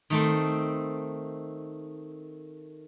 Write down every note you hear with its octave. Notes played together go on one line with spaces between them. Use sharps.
D#3 A3 C4